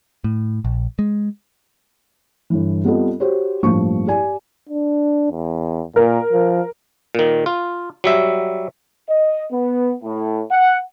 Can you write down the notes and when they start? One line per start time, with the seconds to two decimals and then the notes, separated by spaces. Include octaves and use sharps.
0.24 A2
0.65 A#1
0.99 G#3
2.50 G1 E3
2.84 G3 B3 C4 F4 A4 D#5
3.20 F#4 G4 C5 C#5
3.63 A1 G2 F3 A#3 C#6
4.07 G4 D5 G#5
4.69 D4
5.31 E2
5.96 A#2 A#4
6.32 F3
7.15 A#2 D#3
7.46 F4
8.04 F#3 G3 E5
9.10 D#5
9.51 B3
10.03 A2
10.51 F#5